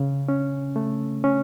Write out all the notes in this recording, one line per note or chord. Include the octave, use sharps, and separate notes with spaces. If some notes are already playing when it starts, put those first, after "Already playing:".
Already playing: C#3
C#4
A3
C#4